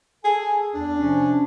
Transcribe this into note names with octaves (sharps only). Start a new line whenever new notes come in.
G#4 A4 G#5
E2 D4
C3 F3 C#4